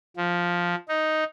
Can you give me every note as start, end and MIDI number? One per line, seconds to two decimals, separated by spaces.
0.17 0.75 53
0.88 1.24 63